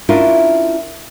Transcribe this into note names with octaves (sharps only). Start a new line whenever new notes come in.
C#4 D4 E4 F4 A#4